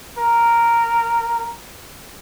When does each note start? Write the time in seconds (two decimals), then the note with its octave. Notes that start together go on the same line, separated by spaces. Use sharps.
0.19 A#4